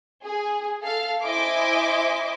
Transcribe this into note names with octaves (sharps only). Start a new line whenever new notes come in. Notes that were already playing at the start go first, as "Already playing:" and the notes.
G#4
A4 F5
E4 C5 D#5 E5 G#5 D6